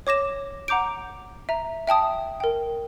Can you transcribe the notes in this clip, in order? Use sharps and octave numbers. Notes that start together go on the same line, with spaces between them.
C#5 D6 A#6 E7
F#5 A#5 D6 G6 D7
E5 A#5
E5 G5 A5 D#6
A#4 G5